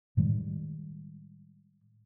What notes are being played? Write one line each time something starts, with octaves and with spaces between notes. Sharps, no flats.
A2 D#3 G3 G#3